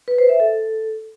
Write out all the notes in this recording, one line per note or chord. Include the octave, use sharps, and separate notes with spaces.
B4
C5
E5
A4